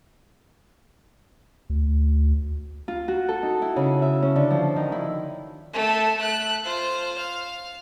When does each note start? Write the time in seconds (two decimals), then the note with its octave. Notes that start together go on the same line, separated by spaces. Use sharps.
1.70 D2
2.88 F4
3.08 F#4
3.29 A4
3.43 D#4
3.62 E4
3.76 C#3
4.02 E5
4.22 C#4
4.36 D3
4.50 F3
4.76 D#3
4.92 E4
5.74 A3 A4
6.17 A3 F#6
6.64 F4 C5
7.18 F5